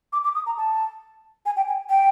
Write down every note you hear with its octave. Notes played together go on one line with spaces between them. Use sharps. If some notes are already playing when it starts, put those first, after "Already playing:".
D6
D6
D#6
A#5
A5
G#5
G5
G#5
G5